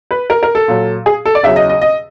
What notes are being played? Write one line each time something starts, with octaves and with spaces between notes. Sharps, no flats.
B4
A#4
A#4
A4
A#2 F#3
G#4
A4
D5
E2 C#3 F#3 E5
D#5
D#5
D#5